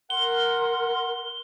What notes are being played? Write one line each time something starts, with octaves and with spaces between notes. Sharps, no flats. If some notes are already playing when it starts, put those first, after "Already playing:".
A#4 F#5 C6 G7